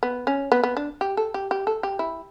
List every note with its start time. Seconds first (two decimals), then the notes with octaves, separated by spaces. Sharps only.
0.03 B3
0.27 C#4
0.52 B3
0.63 B3
0.77 D4
1.01 G4
1.17 A4
1.34 G4
1.51 G4
1.67 A4
1.83 G4
1.99 E4